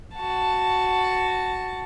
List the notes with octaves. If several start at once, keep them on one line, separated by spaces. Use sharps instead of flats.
F#4 A5